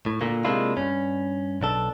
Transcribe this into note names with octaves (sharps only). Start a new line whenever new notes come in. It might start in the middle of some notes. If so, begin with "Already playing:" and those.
A2
A#2 D3 A#3
C3 G#3 A#3 D4 E4 F4
G2 C#4
B1 D4 A4